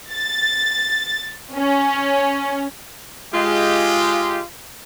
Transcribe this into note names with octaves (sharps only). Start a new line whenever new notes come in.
A6
C#4
G#3 F4 G4